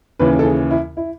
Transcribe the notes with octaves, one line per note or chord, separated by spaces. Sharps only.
D#2 C#3 E3 B4
A4
G#4
E4
E4